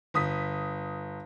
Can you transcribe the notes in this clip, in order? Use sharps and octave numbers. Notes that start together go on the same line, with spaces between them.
G1 D#6 B6